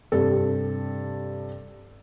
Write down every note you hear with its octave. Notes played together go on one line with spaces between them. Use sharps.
G2 C3 A4